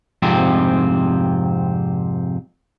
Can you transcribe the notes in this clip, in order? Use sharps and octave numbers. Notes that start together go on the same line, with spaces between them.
F2 G#2 C3 C4